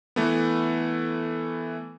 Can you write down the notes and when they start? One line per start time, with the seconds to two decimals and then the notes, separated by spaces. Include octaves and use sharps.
0.16 E3 A3 B3